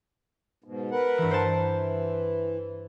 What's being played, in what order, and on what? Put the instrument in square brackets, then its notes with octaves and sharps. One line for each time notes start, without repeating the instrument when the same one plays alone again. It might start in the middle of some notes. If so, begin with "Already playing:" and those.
[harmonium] G#2 B2
A#4 B4 F#5
[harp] G2 E3
C5 A5
[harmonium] E3